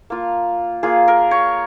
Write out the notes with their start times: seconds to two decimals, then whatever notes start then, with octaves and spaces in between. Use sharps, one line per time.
0.10 A#3 F4
0.83 A#3 F4 G#4
1.08 A#4
1.31 C#5